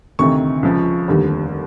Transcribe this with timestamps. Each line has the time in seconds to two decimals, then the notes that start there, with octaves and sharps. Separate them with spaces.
0.19 D2 C3 D#3 C#6
0.63 C#2 C#3 F3
1.08 F1 D#2 D3 G3